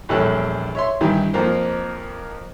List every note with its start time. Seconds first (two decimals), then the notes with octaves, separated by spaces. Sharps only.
0.09 A#1 E2 G3 A4 C#5 F#6
0.75 C#5 E5 C6
1.01 G2 D#3 E3 G3
1.33 F2 F3 A#3 C5